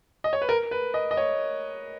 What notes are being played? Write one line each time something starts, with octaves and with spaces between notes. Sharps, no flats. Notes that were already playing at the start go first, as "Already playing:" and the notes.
D#5
C#5
B4
A#4
B4
D#5
D#5
C#5